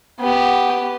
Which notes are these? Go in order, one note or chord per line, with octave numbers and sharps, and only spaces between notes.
B3 G4